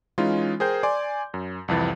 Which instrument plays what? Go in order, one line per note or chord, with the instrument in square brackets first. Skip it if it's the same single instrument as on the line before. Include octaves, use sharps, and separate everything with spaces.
[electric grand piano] E3 G#3 C#4 D#4 F4
G#4 A#4 C5 G5 G6
D5 G#5 C6 D6
F#2
C2 F2 E3 A6